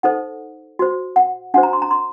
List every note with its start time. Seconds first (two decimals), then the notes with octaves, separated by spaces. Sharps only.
0.03 D#4 A4 C5 F#5
0.79 F#4 C5
1.16 F#5
1.54 D4 F#4 C5 F#5
1.63 A#5
1.73 C6
1.82 A#5
1.91 C6